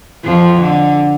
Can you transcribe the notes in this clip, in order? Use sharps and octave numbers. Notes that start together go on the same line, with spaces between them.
F2 F3
D3